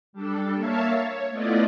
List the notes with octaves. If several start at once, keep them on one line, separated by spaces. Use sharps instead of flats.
G3 D4 A4
A#3 C#5 E5 F5 A5
C#5
A3 B3 E4 F4 D5 D#5